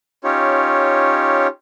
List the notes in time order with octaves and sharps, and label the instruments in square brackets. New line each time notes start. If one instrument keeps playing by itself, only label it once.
[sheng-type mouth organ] C#4 D#4 F4 G4 C#5